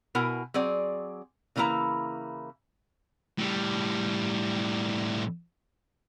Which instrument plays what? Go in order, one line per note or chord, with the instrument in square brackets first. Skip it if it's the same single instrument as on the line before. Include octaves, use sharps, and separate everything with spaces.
[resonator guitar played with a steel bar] B2 E4 A#4 F#5 G#5
F#3 C4 G#4 D5
C#3 E3 A#3 D#4 E4 A#5
[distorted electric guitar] A2 G3